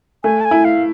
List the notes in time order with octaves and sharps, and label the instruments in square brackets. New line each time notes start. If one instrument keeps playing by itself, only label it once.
[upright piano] A3 [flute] G#5
[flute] A5
G#5
[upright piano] E4
[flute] F5